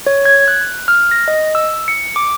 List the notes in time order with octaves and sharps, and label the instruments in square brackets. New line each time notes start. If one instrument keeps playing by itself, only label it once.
[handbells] C#5
G#6
F#6
F6
A#6
D#5
E6
C#7
D6